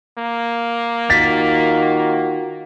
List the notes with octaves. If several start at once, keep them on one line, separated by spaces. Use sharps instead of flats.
A#3
D#3 F4 F#4 A6 B6